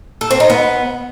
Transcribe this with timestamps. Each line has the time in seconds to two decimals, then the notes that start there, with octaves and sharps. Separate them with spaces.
0.21 A4
0.31 C4
0.40 D#4
0.50 B3